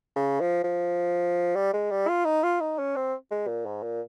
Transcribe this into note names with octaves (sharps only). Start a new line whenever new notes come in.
C#3
F3
F3
G3
G#3
G3
F4
D#4
F4
D#4
C#4
C4
G#3
A#2
G#2
A#2